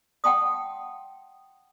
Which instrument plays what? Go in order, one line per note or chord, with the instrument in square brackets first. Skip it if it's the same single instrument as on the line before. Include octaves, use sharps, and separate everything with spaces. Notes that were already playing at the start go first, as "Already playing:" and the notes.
[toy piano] F#5 G5 A5 C6 D#6